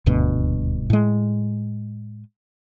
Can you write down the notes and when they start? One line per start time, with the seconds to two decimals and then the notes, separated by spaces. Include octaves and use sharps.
0.06 D#1 D2 G2 B2
0.90 A2 G#3